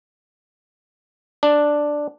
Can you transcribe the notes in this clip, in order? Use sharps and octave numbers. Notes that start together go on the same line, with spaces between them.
D4